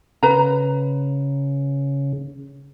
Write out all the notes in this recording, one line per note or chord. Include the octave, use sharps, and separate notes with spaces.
C#3 B4 A#5